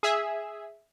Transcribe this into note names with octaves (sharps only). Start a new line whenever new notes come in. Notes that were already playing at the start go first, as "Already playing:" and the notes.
G#4 E5